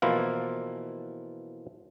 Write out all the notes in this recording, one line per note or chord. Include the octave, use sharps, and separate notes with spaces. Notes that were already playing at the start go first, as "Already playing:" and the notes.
B2 E3 F3 A#3 E4 F4